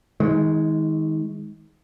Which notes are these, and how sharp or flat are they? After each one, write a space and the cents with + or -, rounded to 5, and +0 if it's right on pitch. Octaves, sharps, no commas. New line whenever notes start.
D#3 +30 G#3 +0